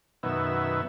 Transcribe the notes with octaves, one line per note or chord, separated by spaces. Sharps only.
F#2 B2 D#3 B3 E5